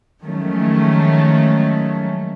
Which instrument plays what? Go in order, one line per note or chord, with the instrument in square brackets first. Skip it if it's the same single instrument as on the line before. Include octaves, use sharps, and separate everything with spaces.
[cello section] D#3 F3 F#3 G#3 A3 C#4